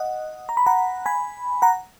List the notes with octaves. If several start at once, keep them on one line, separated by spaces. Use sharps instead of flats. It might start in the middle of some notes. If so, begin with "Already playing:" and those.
Already playing: D#5 F#5
A#5
B5
F#5 A#5
G#5 B5
F#5 A#5